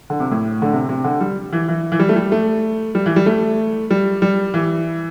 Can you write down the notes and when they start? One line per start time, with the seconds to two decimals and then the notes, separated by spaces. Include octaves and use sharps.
0.10 D3
0.20 C3
0.31 A2
0.62 D3
0.73 C3
0.89 C3
1.04 D3
1.21 G3
1.53 E3
1.68 E3
1.92 E3
1.99 G3
2.09 A3
2.16 G3
2.32 A3
2.95 G3
3.06 E3
3.16 G3
3.26 A3
3.91 G3
4.22 G3
4.54 E3